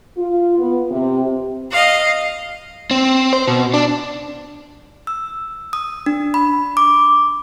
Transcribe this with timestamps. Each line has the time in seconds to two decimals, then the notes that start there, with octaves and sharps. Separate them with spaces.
0.17 F4
0.58 B3
0.89 C3
1.71 D#5 F5
2.91 C4
3.33 C5
3.47 B2
3.74 D4
5.07 E6
5.73 D#6
6.06 D4
6.34 B5
6.77 D6